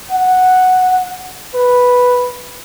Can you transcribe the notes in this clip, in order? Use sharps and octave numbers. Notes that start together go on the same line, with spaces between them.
F#5
B4